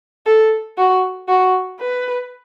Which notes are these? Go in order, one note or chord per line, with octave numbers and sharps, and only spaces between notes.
A4
F#4
F#4
B4